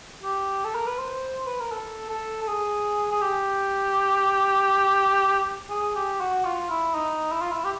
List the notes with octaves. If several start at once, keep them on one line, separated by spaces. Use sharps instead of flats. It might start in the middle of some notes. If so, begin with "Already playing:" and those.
G4
A4
A#4
B4
C5
B4
A#4
A4
A4
A4
G#4
G#4
G4
G#4
G4
F#4
F4
E4
D#4
E4
F4
E4
G4